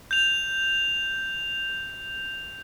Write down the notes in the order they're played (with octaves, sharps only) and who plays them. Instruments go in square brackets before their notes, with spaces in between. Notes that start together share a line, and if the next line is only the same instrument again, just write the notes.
[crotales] G6 F7